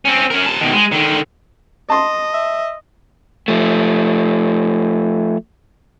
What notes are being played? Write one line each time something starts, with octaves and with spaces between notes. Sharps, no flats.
C4 C#4
C#4 A#4
C3 A5
B2 D#3
G#3
D3 D#3
D#5 A5 C6
E5
F3 A3